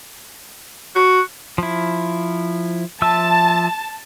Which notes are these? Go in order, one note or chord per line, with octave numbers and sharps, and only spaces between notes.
F#4
F3 E4
F3 E5 A5 E6